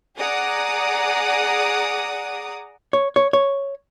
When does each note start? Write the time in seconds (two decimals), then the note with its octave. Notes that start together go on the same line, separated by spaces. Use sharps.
0.19 G#4 D5 F#5 A#5 D6 D#6
2.93 C#5
3.16 C#5
3.33 C#5